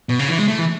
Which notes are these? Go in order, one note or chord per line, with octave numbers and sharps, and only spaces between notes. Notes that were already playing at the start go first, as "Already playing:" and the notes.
B2
C#3
E3
G#3
A3
E3